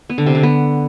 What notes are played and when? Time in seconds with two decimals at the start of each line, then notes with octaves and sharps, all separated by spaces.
0.10 B3
0.18 D3
0.26 C3
0.35 D3
0.43 B3